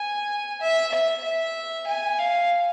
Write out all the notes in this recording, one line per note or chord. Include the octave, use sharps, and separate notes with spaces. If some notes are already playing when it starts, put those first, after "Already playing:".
Already playing: G#5
E5
E5
E5
G#5
F5